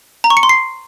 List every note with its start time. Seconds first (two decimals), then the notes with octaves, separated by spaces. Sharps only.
0.24 A#5
0.30 C#6
0.37 C#7
0.43 C6
0.49 C7